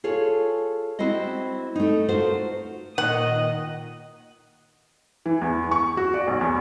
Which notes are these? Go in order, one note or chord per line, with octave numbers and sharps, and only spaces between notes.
F4 G#4 A4 C#5
C4 E4 F#4 C5 D#5
A3 D#4
F4 F#4 A4 A#4 C5
A#2 D#3 D#5 F#5
E3
E2
C#6
F#4
D5
B1
E2